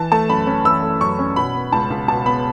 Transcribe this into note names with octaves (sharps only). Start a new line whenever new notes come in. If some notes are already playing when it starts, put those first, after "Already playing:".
Already playing: E3 A5
A3 A5
F#2 B5
C#4
E3 E6
A3
F#2 C#6
C#4
B2 B5
B3
C#2 A5
C#2
B2 A5
B3 B5